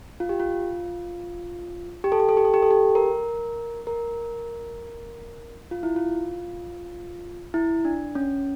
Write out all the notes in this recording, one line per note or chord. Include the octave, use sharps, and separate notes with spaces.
F4
G4
F4
G4
A4
G4
A4
G4
A4
G4
A4
G4
A#4
A#4
F4
E4
F4
E4
D4
C#4